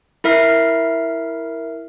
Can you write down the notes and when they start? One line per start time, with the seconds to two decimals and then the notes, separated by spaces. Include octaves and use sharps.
0.24 E4 A#4 E5 F6 C7